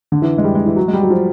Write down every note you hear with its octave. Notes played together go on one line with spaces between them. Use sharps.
D3
E3
G#3
G3
G#3
E3
F#3
G#3
G3
F#3
F3